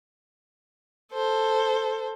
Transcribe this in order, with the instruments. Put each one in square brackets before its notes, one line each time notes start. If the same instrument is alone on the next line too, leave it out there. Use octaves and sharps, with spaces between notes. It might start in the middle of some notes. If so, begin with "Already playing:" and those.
[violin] A4 C5